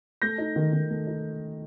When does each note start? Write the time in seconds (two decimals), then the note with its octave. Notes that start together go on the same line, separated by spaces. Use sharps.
0.22 A3 G6 A#6
0.38 D#4
0.56 D#3
0.73 D#3
0.90 A3
1.07 D#4